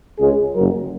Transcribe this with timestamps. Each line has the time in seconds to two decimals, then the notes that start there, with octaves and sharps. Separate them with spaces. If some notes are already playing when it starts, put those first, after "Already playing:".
0.19 C#2 C#3 G#3 C#4 G#4
0.54 F#1 F#2 F#3 A#4